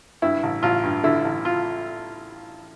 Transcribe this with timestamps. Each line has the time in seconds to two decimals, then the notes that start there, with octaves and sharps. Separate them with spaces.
0.22 G2 E4
0.43 A1
0.63 A1 F4
0.83 G2
1.04 D3 E4
1.25 A1
1.45 F4